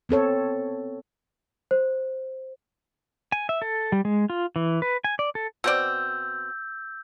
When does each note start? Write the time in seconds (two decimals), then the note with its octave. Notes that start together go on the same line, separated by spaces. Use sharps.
0.09 B3 C4 A4 C#5
1.71 C5
3.32 G#5
3.49 E5
3.62 A4
3.92 G3
4.05 G#3
4.30 F4
4.56 E3
4.82 B4
5.04 G#5
5.19 D5
5.35 A4
5.64 B2 C4 D5 E6 G6